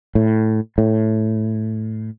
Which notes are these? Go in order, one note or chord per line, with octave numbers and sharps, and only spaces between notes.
A2
A2